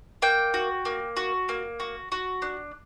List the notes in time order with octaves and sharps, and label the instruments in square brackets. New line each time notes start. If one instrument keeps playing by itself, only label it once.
[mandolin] A#3 G5
F#4
A#3
F#4
A#3
F#4
F#4
D4